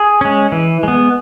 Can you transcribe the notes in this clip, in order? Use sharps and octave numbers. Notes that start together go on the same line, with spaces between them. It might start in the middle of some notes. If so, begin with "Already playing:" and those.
Already playing: G#4
G#3 C#4
E3
G#3 B3